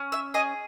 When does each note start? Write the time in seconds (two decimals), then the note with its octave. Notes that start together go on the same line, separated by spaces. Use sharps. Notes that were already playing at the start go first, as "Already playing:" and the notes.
Already playing: C#4
0.12 E5 E6
0.34 G#4 D#5 D#6